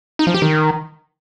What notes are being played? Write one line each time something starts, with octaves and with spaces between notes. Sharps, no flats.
D#4
F3
G4
D#3